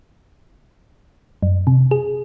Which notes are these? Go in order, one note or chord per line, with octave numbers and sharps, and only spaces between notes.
F#2
C3
G#4